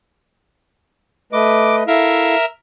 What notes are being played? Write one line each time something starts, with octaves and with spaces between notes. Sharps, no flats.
A3 B4 D#5 D6
E4 A4 A#4 E5 F5